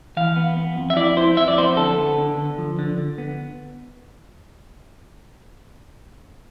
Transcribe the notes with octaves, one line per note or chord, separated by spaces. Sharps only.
E3 F5
B3
B3
F2
E5
E4 D5
E4 C5
F2 E5
D5
B3 C5
D3 A4
B3
D3
D3
F3
D3
D3
B3